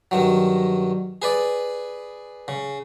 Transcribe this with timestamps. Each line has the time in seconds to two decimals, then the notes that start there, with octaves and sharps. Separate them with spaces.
0.11 G2 D#3 F#3
1.22 G#4 B4 D5
2.48 C#3